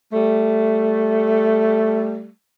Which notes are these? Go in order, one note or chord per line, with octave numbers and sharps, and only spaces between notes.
G3 A3